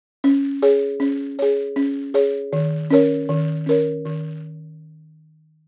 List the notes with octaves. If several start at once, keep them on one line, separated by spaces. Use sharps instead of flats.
C#4
G#4 C#5
C#4
G#4 C#5
C#4
G#4 C#5
D#3
C#4 A#4 C#5
D#3
C#4 A#4 C#5
D#3